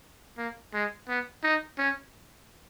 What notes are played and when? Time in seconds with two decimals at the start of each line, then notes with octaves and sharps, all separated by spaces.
0.38 A#3
0.73 G#3
1.08 B3
1.44 D#4
1.78 C#4